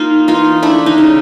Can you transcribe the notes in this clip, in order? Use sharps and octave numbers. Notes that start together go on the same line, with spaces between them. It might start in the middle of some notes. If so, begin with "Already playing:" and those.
Already playing: A#3 D#4 F4
E3 D#4 F4
A3 D4 E4
D#4
C#3